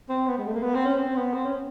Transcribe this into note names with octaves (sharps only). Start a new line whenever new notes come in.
C4
B3
G#3
A3
A#3
B3
C4
C#4
C4
B3
C4
C#4